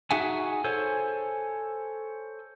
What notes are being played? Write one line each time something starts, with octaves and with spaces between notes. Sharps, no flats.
D#4 F#4 G#4 E5 F#5 G#5
A4 C5 C#5 G#5